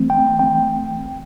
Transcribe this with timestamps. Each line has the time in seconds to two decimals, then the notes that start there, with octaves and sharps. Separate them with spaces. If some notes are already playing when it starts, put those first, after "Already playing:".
Already playing: E3 A3 C4
0.10 G5
0.39 E3 A3 C4 G5